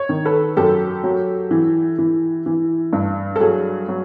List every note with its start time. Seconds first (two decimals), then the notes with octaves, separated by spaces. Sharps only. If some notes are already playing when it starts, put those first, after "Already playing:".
Already playing: C#5
0.09 D#3
0.25 A4 B4
0.57 F#2 G4 A4
1.04 F#3
1.51 E3
1.98 E3
2.46 E3
2.93 G2
3.36 A4
3.40 F#3 G#4
3.89 F#3